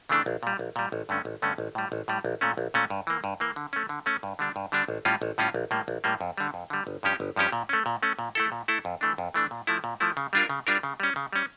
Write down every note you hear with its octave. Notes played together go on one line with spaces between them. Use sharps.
C#3 E3 A3 D4
A#1
A#2 G3
A#1
A#2 G3
A1
G2 D3 A3 C#4
A1
G2 D3 A3 C#4
A1
A2 G3
A1
A2 G3
A#1
A#2 A3 C#4
A#1
A#2 A3 C#4
G2
E3 A#3
G2
E3 A#3
D3
A3 C#4
D3
A3 C#4
G2
D3 G3 D4
G2
D3 G3 D4
A1
A2 G3 C#4 F4
A1
A2 G3 C#4 F4
A#1
A2 G3 A#3
A#1
A2 G3 A#3
F2
D3 G3
F2
D3 G3
G1
G2 F3 C#4 G4
G1
G2 F3 C#4 G4
A#2
A3 C#4
A#2
A3 C#4
A#2
A3 E4 A4
A#2
A3 E4 A4
F2
E3 A3 D4
F2
E3 A3 D4
A#2
F3 A3 E4
A#2
F3 A3 E4
C#3
G3 D4 F4 A#4
C#3
G3 D4 F4 A#4
C#3
G3 C#4
C#3
G3 C#4